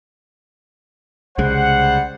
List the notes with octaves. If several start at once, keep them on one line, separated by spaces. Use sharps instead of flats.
C2 C#3 G3 G#3 C5 F#5